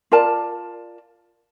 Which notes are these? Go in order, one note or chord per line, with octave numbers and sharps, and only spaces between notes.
F4 A#4 D5 A5